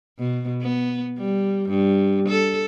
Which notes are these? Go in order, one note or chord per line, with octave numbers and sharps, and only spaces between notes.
B2
B3
G3
G2
A4